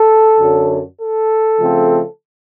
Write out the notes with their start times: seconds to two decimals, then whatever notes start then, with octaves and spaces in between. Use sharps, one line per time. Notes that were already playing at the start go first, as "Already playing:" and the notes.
Already playing: A4
0.40 F#2 D3 F#3
0.99 A4
1.59 C#3 F3 A3 C4